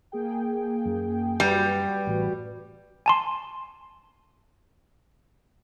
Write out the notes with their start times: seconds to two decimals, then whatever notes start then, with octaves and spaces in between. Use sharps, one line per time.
0.12 A#3 G#4 G5
0.86 F#2
1.40 G3 F#4 B4
2.07 A1
3.06 G#5 A5 C6